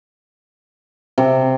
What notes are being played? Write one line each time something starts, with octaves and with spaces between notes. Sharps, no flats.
C3